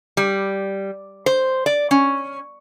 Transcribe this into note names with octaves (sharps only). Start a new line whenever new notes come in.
G3
C5
D5
C#4